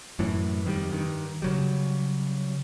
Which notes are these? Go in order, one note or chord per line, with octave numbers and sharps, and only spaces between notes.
F#2 A2 E3
F2 D#3 E3 G3
G2 D#3
C#3 F#3 G3